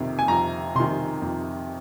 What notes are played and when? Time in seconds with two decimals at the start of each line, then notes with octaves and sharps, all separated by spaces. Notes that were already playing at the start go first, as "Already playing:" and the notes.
Already playing: F2 C3 D#3
0.19 G#5
0.28 F2 A#5
0.75 C3 D#3 C6
1.22 F2